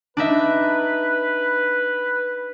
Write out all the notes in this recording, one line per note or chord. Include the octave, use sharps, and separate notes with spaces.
D4 D#4 B4 E5